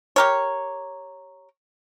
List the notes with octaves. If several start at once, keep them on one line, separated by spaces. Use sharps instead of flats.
G4 A#4 C#5